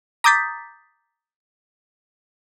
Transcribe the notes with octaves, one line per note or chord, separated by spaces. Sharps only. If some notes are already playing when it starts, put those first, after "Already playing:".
A#5 D6 D#6 G6 A6 B6